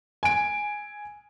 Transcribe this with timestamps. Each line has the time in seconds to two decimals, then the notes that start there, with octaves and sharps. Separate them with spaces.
0.23 G#5 D7